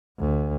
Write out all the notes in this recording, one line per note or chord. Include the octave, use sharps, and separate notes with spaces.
D2